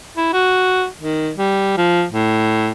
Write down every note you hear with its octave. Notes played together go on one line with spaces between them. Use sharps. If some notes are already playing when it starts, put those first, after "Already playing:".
E4
F#4
D#3
G3
F3
A2